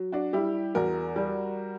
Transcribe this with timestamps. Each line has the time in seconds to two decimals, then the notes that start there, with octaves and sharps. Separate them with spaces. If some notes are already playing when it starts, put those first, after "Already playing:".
Already playing: F#3
0.12 D4 F#4
0.33 G3 E4 G4
0.75 E2 F#4 A#4
1.16 G3